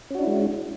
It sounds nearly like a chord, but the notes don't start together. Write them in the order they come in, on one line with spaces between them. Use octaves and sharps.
C#4 F#4 D4 E4 G#3